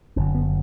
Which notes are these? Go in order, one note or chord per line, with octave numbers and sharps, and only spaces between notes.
F#1 F#2 D3 C4
B3